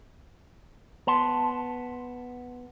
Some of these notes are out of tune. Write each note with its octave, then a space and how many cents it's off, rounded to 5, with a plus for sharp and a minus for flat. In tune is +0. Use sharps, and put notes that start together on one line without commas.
B3 +0 A5 +0 C6 +0